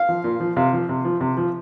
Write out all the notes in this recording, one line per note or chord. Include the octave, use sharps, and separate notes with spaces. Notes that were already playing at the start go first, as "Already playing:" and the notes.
Already playing: F5
F3
A#2
F3
C3 F5
F3
C3
F3
C3
F3